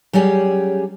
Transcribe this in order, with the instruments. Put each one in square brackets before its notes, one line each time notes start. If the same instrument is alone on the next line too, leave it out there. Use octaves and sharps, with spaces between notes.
[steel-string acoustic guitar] F#3 G3 C#4 G4 G#4